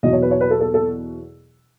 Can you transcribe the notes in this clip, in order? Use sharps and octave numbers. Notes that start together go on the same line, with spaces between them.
E2 B2 F#3 D#5
C#5
B4
C#5
B4
A4
A4
A4